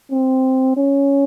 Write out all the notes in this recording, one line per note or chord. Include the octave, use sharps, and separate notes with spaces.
C4
C#4